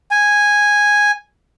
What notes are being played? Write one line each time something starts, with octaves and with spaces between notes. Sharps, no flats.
G#5